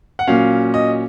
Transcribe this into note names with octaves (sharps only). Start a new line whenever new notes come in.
F#5
A#2 F#3 C#4 F5
D#5